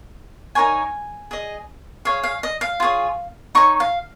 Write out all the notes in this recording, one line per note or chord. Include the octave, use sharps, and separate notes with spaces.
D#4 A#4 C#5 G#5
G#4 D#5
G#4 C#5 F5
F5
D#5
F5
F4 G#4 C#5
D#4 C#5 C#6
F5